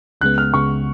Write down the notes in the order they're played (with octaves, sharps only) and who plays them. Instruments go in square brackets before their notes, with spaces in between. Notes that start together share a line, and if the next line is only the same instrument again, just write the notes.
[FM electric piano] C#2 C#3 G#3 B3 [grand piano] F#6
[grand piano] F6
[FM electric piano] C#2 C#3 G#3 B3 [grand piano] C#6